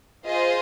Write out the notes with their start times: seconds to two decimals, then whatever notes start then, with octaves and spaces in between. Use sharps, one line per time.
0.25 F4 G#4 C5 D#5